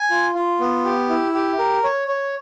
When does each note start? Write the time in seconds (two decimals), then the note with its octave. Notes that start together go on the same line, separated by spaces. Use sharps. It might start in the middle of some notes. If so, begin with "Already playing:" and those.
Already playing: G#5
0.10 F4
0.35 F4
0.60 B3
0.85 G4
1.09 E4
1.34 G4
1.59 A#4
1.84 C#5
2.08 C#5